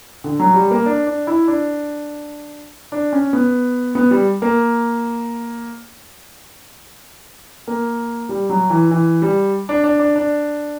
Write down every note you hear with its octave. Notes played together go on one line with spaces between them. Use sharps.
D3
F#3
G3
A#3
D4
D4
E4
D4
D4
C#4
B3
B3
G3
A#3
A#3
G3
F#3
E3
E3
G3
D4
D4
D4
D4